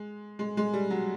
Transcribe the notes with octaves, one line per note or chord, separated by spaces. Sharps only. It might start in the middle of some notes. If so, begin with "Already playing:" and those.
Already playing: G#3
G#3
G#3
G3
F#3